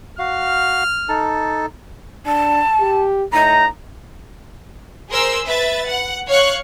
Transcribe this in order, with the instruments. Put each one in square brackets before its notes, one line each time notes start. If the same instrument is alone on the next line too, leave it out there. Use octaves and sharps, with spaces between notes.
[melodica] F#4 F5 [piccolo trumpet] F6
[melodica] D#4 A4 A5
[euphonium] D4 [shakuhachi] A5
[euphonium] G4
[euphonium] A2 [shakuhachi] D#4 [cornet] A#5
[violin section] G#4 A#4 C5 C6 E6
B4 E5 A6
F#5
C#5 F5 C#6 F#6